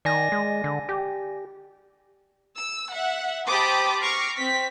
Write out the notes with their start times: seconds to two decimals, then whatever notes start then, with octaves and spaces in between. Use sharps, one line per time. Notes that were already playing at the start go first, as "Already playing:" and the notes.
0.05 D#3 D5 G#5 A#6
0.32 G#3
0.64 D3
0.89 G4
2.59 E6
2.93 E5 F#5
3.47 G4 C5 A5 B5 D6 D#6
4.01 C#6 D6 F6 A#6 C7
4.37 C4 B6